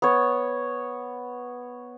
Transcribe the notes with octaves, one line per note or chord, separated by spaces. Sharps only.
B3 C#5